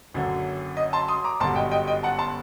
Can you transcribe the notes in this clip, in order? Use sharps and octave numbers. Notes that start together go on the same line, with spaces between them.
F#1 F#2 D3
D#5
A5 C6
C6 D#6
A#5 D6
G1 F#2 D3 G3 A5 C6
D#5 G5
D#5 G5
D#5 G5
F#5 A5
A5 C6